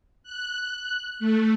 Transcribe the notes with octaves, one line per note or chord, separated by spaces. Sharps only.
F#6
A3